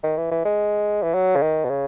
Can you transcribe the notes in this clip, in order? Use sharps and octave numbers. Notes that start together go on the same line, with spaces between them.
D#3
E3
E3
G#3
E3
F#3
C#3
D#3
B2
C#3